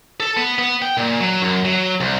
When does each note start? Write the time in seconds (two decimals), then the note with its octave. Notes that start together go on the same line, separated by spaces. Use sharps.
0.20 A4
0.37 B3
0.59 B3
0.82 G5
0.97 A#2
1.20 F#3
1.42 F#2
1.65 F#3
2.00 C2